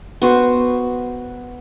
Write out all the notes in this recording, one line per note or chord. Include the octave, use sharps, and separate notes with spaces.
B3 F#4 C5